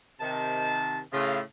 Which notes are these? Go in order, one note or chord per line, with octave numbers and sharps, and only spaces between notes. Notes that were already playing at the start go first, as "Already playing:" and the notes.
C3 D#3 A5
A2 C#3 F4